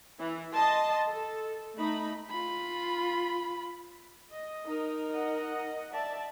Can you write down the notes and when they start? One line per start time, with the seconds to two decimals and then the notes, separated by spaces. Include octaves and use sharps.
0.20 E3
0.53 D#5 A5 C6
1.12 A4
1.75 A3 D#4 B5
2.30 F4 B5
4.32 D#5
4.66 D#4 A#4
5.11 D#5 F#5
5.93 D5 E5 A5